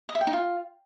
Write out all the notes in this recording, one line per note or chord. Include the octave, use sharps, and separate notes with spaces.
D#5
E5
G5
D#4
F4